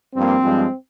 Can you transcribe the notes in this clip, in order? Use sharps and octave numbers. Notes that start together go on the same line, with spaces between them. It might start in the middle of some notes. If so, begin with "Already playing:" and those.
G2 F3 A#3 C4
G2 F3 G#3